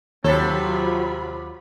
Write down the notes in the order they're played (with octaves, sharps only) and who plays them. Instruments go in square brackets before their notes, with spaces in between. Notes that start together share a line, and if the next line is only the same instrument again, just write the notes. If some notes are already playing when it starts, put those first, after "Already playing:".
[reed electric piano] D#2 [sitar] C3 A4 [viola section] F#3 F4 B5 [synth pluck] C#5